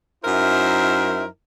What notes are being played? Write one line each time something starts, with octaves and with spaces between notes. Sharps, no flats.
F#2 D#4 E4 A#4 C5 E5